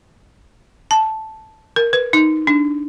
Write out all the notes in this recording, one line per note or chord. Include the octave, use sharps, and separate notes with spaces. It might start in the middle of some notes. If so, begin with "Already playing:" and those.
A5
A#4
B4
D#4
D4